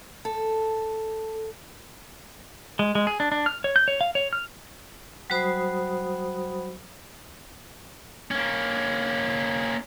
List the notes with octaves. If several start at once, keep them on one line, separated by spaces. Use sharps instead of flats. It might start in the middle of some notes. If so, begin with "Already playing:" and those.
A4
G#3
G#3
G#4
D4
D4
F6
C#5
G6
C#5
F5
C#5
F6
F#3 G3 F#4 C5 B5 D#6
A#3 C#4